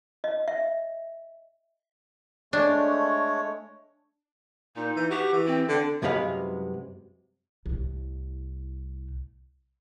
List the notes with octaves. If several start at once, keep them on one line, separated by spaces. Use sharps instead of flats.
D#5
E5
G#3 A3 D4 C#5
A#2 D#4
E3
F#4 G4
E3
C4
D3
C2 F#2 C3 G#3 B4 F5
C2 A2